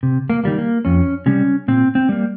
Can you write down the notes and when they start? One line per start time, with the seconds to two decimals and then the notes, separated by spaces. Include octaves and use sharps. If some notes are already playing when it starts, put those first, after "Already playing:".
0.03 C3
0.30 A#3
0.44 D#3 G3 A#3
0.58 A#3
0.85 F2 C#4
1.26 C3 G3 C#4
1.68 A#2 C4
1.95 C4
2.09 G3 A#3